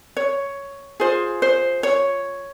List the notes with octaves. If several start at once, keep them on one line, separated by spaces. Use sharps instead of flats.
C#5
F4 G#4 C5
C5
C#5